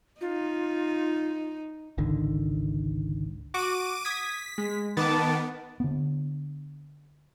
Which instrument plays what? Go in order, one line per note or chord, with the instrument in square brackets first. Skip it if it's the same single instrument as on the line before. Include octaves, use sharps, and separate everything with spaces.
[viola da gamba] D#4 [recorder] F4
[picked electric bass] G#1 C#2 D3 D#3
[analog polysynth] F#4 [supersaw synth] D6 D#7
[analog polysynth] D#6 G#6 [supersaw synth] B6
[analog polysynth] G#3
[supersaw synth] D#3 B3 [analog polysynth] A5 D6 A6
[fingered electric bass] D3 B3